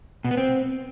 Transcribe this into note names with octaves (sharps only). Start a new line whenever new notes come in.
B2
B3
C4